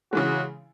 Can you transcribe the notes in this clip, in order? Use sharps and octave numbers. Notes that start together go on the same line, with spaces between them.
C#3 E3 G#3 F#4